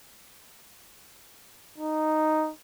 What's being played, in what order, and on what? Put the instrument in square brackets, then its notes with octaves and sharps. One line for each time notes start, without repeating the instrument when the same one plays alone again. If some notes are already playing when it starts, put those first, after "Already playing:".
[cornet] D#4